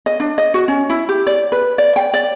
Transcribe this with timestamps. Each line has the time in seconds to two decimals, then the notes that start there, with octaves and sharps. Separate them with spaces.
0.06 D#5
0.20 D4
0.38 D#5
0.54 F#4
0.68 C#4
0.90 E4
1.09 G4
1.27 D5
1.52 B4
1.78 D5
1.96 G5
2.13 D5